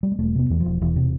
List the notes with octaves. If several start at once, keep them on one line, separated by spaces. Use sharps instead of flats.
G3
G#3
E1 A3
C3 B3
E2 E3
E1 F3
E1 E3
C3